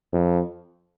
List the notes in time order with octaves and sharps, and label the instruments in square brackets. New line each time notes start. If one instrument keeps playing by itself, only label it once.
[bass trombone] F2